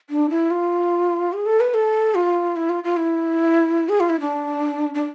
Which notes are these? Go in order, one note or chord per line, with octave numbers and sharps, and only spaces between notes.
D4
E4
F4
G#4
A4
B4
A4
F4
E4
F4
F4
E4
G#4
F4
E4
D4
D4